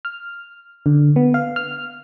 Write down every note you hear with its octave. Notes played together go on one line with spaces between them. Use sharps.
F6
D3
B3
F5
F6